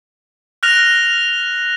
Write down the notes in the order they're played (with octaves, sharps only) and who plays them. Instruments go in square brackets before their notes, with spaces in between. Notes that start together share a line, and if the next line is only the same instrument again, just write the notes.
[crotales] F6 F#6 A#6 F7